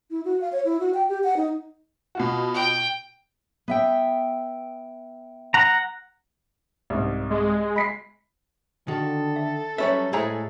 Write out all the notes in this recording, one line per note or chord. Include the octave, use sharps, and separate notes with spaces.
E4
F#4
F5
C#5
E4
F#4
G5
G4
F#5
D#4
B2 F4 F#4
G5
B3 E5 G5
F#5 A#5
C2 G#2
G#3
B5 B6 C7
D3 D#3 F#4 A4
E5
F#3 G3 C#4 B4 C#5 E5
A2 G#3 A3 G#4 C5 G#5 A#5